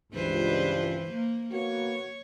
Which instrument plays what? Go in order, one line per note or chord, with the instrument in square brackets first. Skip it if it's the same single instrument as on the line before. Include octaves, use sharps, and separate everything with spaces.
[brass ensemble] C#2 G2 [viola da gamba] E3 B4 C5
[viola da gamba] A#3
[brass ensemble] A#3 B3 F#4 [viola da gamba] C#5